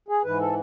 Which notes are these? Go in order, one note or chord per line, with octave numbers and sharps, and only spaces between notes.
G#4
G#2 E3 B4
A4